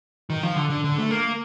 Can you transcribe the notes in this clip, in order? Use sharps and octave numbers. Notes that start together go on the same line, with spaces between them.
D#3
F3
D3
D3
D3
A3
A#3